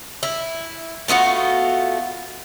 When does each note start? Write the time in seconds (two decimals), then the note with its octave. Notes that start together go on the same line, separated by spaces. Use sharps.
0.23 E4
1.08 A3 B3 F4 F#4